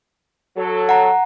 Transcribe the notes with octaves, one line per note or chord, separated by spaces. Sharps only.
F#3 A4
F#5 A#5